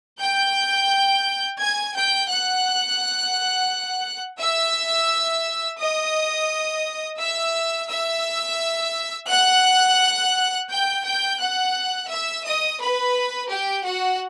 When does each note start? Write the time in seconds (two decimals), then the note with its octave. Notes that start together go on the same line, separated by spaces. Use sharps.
0.19 G5 G6
1.59 G#5 G#6
1.94 G5 G6
2.29 F#5 F#6
4.40 E5 E6
5.80 D#5 D#6
7.20 E5 E6
7.89 E5 E6
9.29 F#5 F#6
10.70 G5 G6
11.05 G5 G6
11.40 F#5 F#6
12.10 E5 E6
12.45 D#5 D#6
12.80 B4 B5
13.50 G4 G5
13.85 F#4 F#5